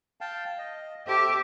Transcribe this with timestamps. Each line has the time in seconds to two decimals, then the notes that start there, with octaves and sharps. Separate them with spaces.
0.21 F5 G5 A5
0.58 D#5
1.07 G4 A4 C5 E5